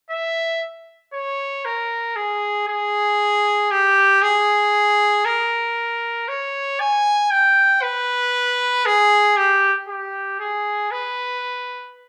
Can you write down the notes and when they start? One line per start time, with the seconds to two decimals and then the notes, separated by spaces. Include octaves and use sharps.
0.11 E5
1.14 C#5
1.65 A#4
2.16 G#4
2.68 G#4
3.71 G4
4.22 G#4
5.25 A#4
6.28 C#5
6.80 G#5
7.31 G5
7.82 B4
8.86 G#4
9.37 G4
9.88 G4
10.40 G#4
10.91 B4